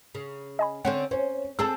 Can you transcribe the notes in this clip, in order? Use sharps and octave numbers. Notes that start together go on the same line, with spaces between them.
C#3
D#5 G#5 B5
D3 C4 C#4 F#5
C#4 C5
C4 G#4 A4 A5 E6